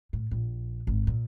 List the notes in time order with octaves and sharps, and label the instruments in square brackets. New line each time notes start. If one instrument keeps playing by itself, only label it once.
[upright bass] A2
A#1
G#1
A#2